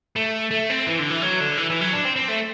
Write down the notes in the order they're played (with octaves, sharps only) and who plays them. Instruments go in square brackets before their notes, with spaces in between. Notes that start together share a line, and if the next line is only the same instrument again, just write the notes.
[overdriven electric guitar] A3
A3
C4
E3
D3
E3
F#3
D3
E3
E3
F#3
D4
C4
C4
A3